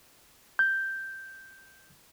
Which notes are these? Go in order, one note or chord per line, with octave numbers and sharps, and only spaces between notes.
G6